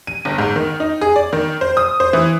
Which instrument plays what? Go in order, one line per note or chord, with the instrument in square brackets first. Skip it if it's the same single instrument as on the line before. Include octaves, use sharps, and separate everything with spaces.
[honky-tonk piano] D#7
G1
G#2
D#3
D#4
G#4
D5
D#3
C5
D#6
C5
E3